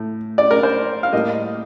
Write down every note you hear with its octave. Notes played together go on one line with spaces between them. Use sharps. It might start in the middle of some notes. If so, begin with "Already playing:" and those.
Already playing: A2
D5
A#4
C5
F5
A2 G3 A#3 D#5